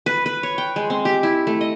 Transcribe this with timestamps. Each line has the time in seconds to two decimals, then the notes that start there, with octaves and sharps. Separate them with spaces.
0.06 B4
0.26 B4
0.43 C#5
0.58 G5
0.76 G#3
0.90 C4
1.05 G4
1.23 E4
1.47 A3
1.61 D#5